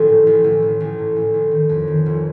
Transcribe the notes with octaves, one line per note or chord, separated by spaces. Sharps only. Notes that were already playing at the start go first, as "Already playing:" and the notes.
Already playing: A1 G4 A4
A2
A1
A1
A1
A1
A2
A1
A1
D#3
F2
D#3
F1